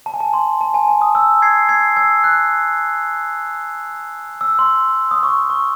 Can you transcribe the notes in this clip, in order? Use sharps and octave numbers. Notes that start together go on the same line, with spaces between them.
A5
G#5
A5
C6
A5
G#5
A5
D#6
E6
G#6 C7
G#6 C7
E6 G#6
F#6
E6
C6
D#6
C#6
C#6